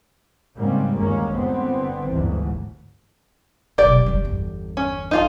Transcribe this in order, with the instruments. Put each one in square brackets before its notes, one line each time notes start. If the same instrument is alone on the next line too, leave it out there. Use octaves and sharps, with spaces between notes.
[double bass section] G#2 C#3 G3 A#3 C4
G1 D#2 G#2 G#3 A#3 C#4
G1 D3 B3 C4
G1 D2 G#2 E3
[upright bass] F1 B1 [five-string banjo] G4 D5
[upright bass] F#1 G3
G1 E2
[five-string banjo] C#4
D#4 F4 A4